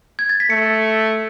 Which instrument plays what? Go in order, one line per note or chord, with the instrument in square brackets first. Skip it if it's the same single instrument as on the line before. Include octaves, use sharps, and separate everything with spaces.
[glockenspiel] G#6
A6
B6
[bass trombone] A3 [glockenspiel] C#7